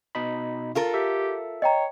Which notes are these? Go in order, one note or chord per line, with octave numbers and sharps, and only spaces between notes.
B2 D#4 B5
F4 A4 A#4
G4 E5
C#5 D#5 G5 A#5